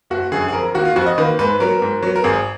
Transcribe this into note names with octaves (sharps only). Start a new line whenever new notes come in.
F#1 F#4
F#2 D3 G#4
G#4
F2 A#4
D#3 A#3 F#4
F4
F2 F#4
D#5
D#3 A#3 B4
G#2 B4
F#3 B3 A#4
G#2
F#3 B3
A#4
G#1 G#4